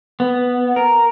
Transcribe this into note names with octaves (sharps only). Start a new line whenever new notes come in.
B3
A#4